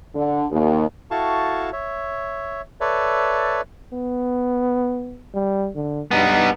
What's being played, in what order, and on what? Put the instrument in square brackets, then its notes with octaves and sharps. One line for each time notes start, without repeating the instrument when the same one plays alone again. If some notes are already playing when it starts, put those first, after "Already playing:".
[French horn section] D3
D#2
[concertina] E4 F#4 A4 F5 A5 C#6
C#5 E5
A4 B4 C#5 D5 E5
[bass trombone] B3
G3
D3
[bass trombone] G2 [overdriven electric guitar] B3 D#4